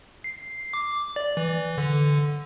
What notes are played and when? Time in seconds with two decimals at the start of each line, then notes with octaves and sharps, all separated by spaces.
0.24 C7
0.73 D6
1.16 D5
1.37 E3
1.78 D3